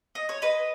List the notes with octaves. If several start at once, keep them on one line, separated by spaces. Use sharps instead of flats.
D#5
C#5
B4 D#5